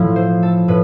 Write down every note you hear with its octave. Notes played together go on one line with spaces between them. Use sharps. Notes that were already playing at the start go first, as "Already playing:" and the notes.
Already playing: A2 F3 E4 A4
C5
A4
A2 B4